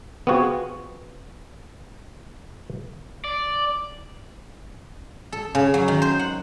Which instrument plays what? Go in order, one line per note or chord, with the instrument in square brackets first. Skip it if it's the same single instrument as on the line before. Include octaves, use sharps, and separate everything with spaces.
[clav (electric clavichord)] B3 C4 F4 F#4 G#4
[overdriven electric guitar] D5
[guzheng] A4
C#3
F#3
D#3
C5
F#5